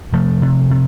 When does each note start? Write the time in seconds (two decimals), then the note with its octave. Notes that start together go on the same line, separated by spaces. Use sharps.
0.13 C3 F3 A3
0.42 C3
0.70 C3